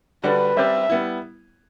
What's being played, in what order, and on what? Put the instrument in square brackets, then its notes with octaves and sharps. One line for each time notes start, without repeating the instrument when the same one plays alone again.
[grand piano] D3 G3 D4 F#4 [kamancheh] B4
[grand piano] G3 C4 G4 B4 D5 [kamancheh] E5
[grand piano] G3 B3 E4